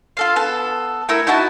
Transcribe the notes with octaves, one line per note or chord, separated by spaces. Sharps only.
F4 A4 F5
B3 A4 A5
A3 E4 A#4 E6
D#4 E4 F#4 A5